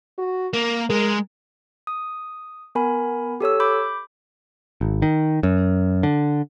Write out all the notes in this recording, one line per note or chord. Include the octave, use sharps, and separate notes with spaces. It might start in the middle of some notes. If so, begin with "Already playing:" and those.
F#4
A#3 A#4
G#3 A#4
D#6
B3 A#4 G#5 B5
G4 A4 C#5 E6
B5 D6 G6
G#1
D#3
F#2
D3